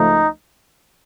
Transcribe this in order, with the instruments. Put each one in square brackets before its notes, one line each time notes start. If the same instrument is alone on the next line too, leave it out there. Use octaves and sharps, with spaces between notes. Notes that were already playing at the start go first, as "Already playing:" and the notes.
Already playing: [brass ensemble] C#2 C#3 F3 A3 D#4